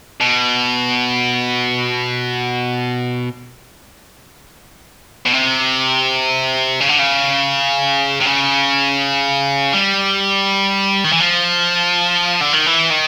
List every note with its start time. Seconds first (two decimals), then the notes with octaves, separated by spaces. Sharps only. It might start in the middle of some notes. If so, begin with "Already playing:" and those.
0.21 B2
5.26 B2
5.33 C3
6.80 C#3
6.89 D3
6.99 C#3
8.21 C3
8.27 C#3
9.73 G3
11.04 D#3
11.12 E3
11.20 F3
12.41 D3
12.53 D#3
12.66 E3
12.91 D#3